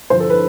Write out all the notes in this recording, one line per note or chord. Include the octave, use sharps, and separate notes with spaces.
G2 D3 F3 C5
A4
B4